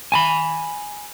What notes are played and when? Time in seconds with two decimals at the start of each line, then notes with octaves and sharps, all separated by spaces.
0.12 G#5 A5 B5